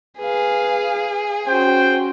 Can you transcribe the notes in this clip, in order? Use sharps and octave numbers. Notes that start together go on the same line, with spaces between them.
G#4 B4 F5
C#4 F#4 C5 G5